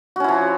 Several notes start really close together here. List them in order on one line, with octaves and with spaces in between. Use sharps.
F#4 C#4 E4 F3